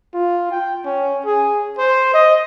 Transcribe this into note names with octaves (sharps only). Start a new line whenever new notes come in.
F4
G5
C#4
G#4
C5
D#5